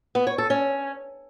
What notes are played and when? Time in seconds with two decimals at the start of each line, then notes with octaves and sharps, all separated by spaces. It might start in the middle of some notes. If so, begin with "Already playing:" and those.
0.15 B3
0.27 C#5
0.38 A4
0.50 C#4